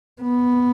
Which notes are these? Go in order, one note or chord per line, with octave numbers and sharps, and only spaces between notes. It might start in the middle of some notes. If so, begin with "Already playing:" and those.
B3